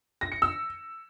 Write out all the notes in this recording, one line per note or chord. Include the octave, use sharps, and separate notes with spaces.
A#6
C#7
E6